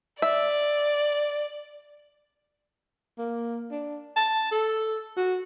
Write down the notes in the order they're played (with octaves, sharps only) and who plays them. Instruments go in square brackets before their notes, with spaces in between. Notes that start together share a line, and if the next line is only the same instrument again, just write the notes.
[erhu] D5 [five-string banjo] E5
[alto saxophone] A#3
D4
A5
A4
F#4